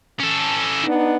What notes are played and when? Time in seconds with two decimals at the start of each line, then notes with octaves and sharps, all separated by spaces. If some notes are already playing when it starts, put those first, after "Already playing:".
0.20 C#4 A4
0.84 B3 D4 D#4